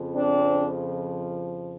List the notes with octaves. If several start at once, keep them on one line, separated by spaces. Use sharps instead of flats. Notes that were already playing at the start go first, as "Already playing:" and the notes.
Already playing: F2 C#3 F3
C4 D4